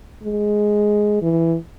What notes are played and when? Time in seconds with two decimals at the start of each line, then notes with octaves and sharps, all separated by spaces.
0.23 G#3
1.22 E3